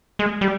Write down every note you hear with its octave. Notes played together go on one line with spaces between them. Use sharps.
G#3
G3